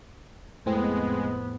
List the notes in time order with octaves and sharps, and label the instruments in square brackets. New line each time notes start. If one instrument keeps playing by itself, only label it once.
[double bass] F2 B3 [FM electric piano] A2 C4 [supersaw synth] G#3